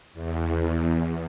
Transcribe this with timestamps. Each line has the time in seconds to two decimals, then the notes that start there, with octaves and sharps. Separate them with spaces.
0.13 E2